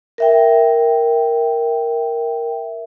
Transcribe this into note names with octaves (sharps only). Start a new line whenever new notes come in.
A#4 E5 G5